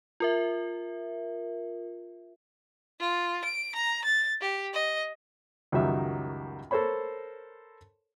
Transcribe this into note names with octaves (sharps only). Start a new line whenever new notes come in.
F4 A#4 E5
F4
D7
A#5
A6
G4
D#5
C#2 F#2 D#3 F#3 G3 E5
A4 A#4 C5 C#5 B5